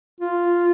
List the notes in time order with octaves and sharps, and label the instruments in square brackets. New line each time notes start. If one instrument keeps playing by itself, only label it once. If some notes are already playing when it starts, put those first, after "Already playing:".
[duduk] F4